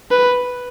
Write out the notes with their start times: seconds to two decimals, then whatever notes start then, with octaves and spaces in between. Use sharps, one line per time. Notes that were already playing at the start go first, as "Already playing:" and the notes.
0.11 B4